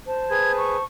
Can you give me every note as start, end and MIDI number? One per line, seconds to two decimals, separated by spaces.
0.06 0.83 72
0.06 0.83 81
0.31 0.76 68
0.31 0.76 71
0.31 0.52 92
0.58 0.85 85